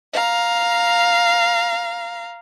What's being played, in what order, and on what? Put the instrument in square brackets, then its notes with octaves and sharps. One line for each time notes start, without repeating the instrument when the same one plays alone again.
[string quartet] F5 A#5